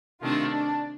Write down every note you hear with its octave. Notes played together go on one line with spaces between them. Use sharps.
C3 D#3 A3 D4 F4
D4